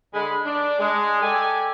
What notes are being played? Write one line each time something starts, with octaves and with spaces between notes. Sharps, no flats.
D3 G#3 B5
D4
G#3
G4 A4 D5 G#5